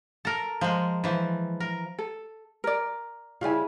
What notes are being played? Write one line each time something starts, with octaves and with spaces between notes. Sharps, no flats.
A4 A#4
F3 G#3
E3 F3
A#4
A4
A#4 D5
C#3 G3 E4 F4 G#5